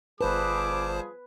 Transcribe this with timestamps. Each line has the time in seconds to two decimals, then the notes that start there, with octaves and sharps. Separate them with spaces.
0.21 G1 F3 G3 G#4 B4 C5 A5 D6